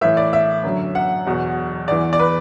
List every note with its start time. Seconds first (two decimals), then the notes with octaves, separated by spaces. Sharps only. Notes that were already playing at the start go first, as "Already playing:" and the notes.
0.01 A2 E3 E5
0.17 D5
0.33 E5
0.63 F#2 D3 F#3
0.95 F#5
1.26 E2 B2 F#3
1.88 E2 E3 D5
2.13 D5
2.19 B4